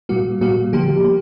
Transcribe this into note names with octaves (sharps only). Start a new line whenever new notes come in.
A#2 G3 A#3 F#4
A#2 G3 A#3 F#4
D3 F3 A#3 G4
A#3